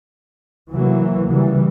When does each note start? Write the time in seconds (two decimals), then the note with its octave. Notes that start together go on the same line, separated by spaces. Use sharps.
0.71 C3 E3 F#3 A#3
1.28 C#3 E3 G3